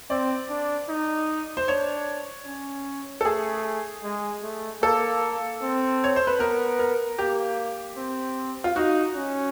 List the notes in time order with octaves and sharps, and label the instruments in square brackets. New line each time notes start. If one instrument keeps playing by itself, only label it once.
[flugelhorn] C4 [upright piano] D5
[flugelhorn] D4
D#4
[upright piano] C5
[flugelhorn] D4 [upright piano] C#5
[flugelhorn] C#4
[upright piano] A4
[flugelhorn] A3 [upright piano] G#4
[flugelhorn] G#3
A3
[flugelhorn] A#3 [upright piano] A4
[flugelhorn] C4
[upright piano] C#5
C5
B4
[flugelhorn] B3 [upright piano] A#4
[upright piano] A#4
[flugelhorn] A#3 [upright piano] G4
[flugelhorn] C4
[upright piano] F4
[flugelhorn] D#4 [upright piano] F#4
[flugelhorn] C#4